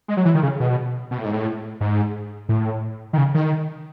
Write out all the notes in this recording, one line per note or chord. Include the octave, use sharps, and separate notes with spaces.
G#3
F#3
E3
D#3
C#3
B2
B2
A2
G#2
A2
G#2
A2
D#3
C#3
D#3